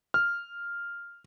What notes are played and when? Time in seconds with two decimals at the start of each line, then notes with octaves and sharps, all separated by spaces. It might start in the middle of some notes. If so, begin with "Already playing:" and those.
0.14 F6